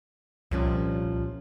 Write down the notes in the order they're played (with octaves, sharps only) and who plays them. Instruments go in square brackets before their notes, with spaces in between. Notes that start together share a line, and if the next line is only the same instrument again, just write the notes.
[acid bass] C2 [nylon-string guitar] A#2 F3 C#4